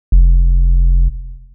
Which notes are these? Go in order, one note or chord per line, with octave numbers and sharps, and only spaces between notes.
F1